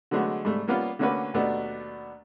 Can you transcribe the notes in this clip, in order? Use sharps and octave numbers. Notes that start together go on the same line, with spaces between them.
D3 F#3 G#3 A3 B3
G#2 G3 A3
G3 A#3 B3 C#4 F4
D3 A3 A#3 C#4 F#4 B4
D#2 B2 A3 B3 D4